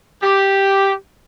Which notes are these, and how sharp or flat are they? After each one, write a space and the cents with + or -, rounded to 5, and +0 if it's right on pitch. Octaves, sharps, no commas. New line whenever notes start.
G4 +0